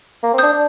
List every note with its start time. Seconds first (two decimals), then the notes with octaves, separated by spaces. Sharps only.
0.23 A#3
0.33 C4
0.38 D4 D#6 G6
0.52 D4